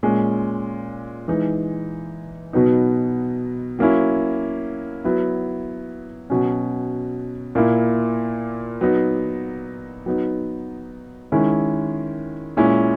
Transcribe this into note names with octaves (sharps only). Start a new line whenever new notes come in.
A#2 G#3 C#4
E3 G#3 D#4
B2 F#3 B3 D#4
F#3 A#3 C#4 E4
F#3 B3 E4
B2 F#3 C#4
A#2 A#3 E4
F#3 B3 D#4
F#3 B3 D#4
D#3 G#3 C#4 E4
A#2 G#3 C#4 E4